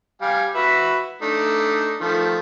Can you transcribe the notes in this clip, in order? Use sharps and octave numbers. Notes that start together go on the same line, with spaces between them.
G3 F5 G#5
F#4 B4 E5
A3 D4 D#4
D#3 F3 A3